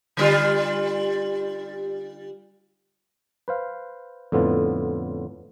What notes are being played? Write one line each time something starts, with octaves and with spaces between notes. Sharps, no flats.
D3 G3 F4
B4 C5 F5
F2 A2 D3 B3 F4